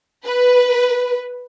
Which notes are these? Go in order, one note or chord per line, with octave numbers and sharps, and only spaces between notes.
B4